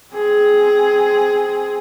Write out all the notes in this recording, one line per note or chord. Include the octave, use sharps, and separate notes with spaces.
C4 G#4